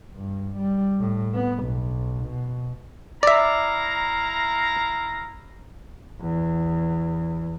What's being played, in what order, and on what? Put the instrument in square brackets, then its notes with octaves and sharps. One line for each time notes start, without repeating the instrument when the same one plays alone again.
[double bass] G2
G3
A2
B3
B1
B2
[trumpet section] E4 F5 A#5 [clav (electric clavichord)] D5 E5
[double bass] E2